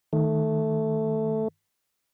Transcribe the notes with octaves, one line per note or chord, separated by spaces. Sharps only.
D#3 A3